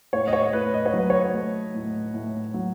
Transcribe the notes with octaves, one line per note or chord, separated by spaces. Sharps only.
A2 C#5
D#5
C#5
A2 B4
D#5
C#5
F#3 B4
C#5
A3
A2
A2
F#3